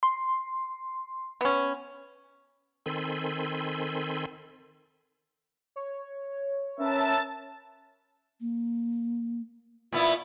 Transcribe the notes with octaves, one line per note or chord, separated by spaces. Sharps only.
C6
B3 C#4
D#3 C4 A4 G#5 B5 C6
C#5
C#4 A#4 B4 E5 A5
A#3
A#2 B3 E4 F4